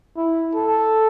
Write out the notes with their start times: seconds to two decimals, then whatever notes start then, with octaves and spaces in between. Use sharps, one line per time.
0.17 E4
0.55 A4